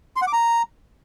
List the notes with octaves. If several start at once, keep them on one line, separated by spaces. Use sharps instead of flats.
C6
F#5
D6
A#5